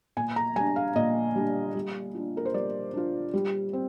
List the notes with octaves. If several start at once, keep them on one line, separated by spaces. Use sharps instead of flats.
A#2 G#5
A#5
G3 D4 G#5
F5
A#2 D#5
G3 D4
G3
D4 F4
A#4
C5
G3 D5
D4 F4
G3
C4